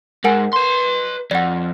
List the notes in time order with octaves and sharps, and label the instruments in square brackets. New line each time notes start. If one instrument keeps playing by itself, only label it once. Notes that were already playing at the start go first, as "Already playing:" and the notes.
[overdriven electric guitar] G#2 [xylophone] A#4 F#5 G#5
[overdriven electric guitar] B4 C6
[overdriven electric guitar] F2 [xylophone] D5 F#5